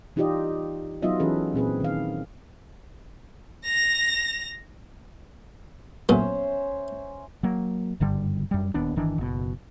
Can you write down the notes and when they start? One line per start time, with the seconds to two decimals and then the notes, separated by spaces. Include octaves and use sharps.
0.16 E3 D#4 F4 G4 D5 D#5
1.02 F#3 B3 D#4 F4 D#5 E5
1.20 E3 C#4 G#4 A4 B4
1.54 A#2 C4 G#4 B4
1.80 D#3 F5
3.65 A#6 F7
6.09 B1 A#2 A3 C#4 C5 E5
7.43 F#3 A#3
8.00 F#1 G2 D3 G3
8.51 F#2 G3
8.74 D#1 D#2 B3 D4
8.96 G1 D#3 E3 D4
9.18 F#1 B2